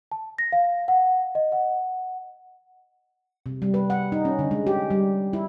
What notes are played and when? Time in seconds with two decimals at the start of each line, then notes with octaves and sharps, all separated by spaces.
0.12 A5
0.38 A#6
0.52 F5
0.88 F#5
1.35 D#5
1.52 F#5
3.46 C3
3.62 G3
3.74 B4
3.90 F#5
4.12 D#4
4.25 C#4
4.39 D3
4.51 G#3
4.67 G4
4.90 G3
5.33 E4